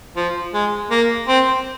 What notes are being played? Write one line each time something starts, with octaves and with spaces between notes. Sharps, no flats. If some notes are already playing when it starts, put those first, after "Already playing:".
F3
G#3
A#3
C4